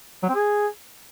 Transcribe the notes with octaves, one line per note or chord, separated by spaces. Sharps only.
F#3
C4
G#4